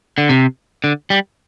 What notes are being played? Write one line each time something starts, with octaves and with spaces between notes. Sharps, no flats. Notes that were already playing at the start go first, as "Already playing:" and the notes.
D3
C3
D3
G3